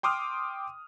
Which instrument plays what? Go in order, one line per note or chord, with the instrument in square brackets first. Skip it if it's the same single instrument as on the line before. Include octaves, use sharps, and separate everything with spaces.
[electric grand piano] G5 C6 D6 D#6 F6